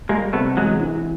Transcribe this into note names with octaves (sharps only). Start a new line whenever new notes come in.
G3 G#3 A#3
C3 A3 B3
E2 F#3 G#3
E3